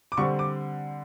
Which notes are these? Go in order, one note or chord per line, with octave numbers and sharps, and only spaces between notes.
D6
D3 G3 C4 C#6
D6